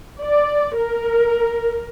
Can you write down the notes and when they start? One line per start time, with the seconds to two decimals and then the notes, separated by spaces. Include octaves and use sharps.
0.21 D5
0.76 A#4